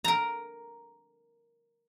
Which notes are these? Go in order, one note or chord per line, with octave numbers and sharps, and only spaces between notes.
A#4 A#5